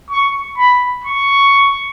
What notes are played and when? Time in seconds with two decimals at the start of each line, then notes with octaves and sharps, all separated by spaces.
0.11 C#6
0.57 B5
1.04 C#6